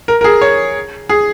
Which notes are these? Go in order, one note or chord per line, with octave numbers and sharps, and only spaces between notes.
A#4
A#4
G#4
C#5
G#4